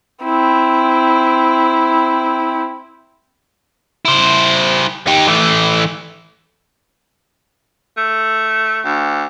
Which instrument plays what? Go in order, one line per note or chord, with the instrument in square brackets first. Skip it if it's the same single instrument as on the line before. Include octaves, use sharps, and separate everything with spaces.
[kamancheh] C4 E4
[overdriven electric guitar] E4 C5
D#4 G4
E3 A3
[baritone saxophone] A3
D2